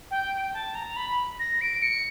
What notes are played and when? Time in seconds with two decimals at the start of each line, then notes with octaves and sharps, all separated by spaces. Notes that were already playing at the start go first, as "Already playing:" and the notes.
0.11 G5
0.54 A5
0.75 A#5
0.96 B5
1.39 A#6
1.61 D7
1.82 C#7